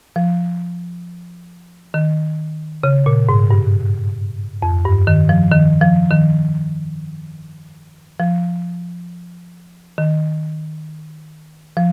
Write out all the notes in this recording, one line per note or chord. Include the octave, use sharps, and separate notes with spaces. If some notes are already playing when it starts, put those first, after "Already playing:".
F3
D#3
C#3
A#2
G#2
G2
F2
G2
D#3
F3
D#3
F3
D#3
F3
D#3
F3